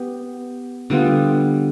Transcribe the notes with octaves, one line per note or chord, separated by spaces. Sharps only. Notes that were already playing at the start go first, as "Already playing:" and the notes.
Already playing: B3 G4
D3 G3 B3 F4